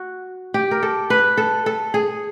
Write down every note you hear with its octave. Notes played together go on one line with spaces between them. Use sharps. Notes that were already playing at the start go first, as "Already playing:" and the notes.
Already playing: F#4
G4
A#4
A4
B4
A4
A4
G#4